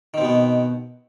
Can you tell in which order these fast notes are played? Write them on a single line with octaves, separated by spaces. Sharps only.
D#3 C4 B2 B3